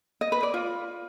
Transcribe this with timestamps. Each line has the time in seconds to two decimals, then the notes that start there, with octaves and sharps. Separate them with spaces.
0.21 D#5
0.32 B4
0.43 D5
0.54 F4